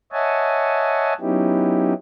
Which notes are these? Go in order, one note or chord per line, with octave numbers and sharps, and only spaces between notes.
C#5 D#5 E5 F#5 G#5 A5
F#3 B3 C#4 D#4 E4 G4